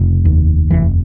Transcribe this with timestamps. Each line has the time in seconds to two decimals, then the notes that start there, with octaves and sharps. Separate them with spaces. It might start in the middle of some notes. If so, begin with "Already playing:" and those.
Already playing: F1 C#3
0.25 D#2
0.71 F1 E3